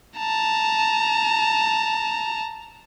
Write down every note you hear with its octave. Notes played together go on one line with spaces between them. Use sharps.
A5 A#5